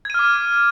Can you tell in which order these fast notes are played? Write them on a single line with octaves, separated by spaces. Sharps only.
G#6 D#7 F6 D6